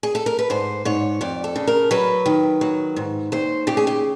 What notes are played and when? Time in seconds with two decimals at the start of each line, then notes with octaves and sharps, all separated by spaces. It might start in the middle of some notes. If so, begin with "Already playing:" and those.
0.03 G#4
0.15 A4
0.26 A#4
0.39 B4
0.50 G#2 C5
0.85 G#2 C#5
1.21 F2 D5
1.44 A4
1.56 C#3
1.67 A#4
1.91 F#3 B4
2.26 D#3
2.61 F#3
2.96 G#2
3.32 D#2 C5
3.67 C#3 G4
3.77 G#4
3.87 G4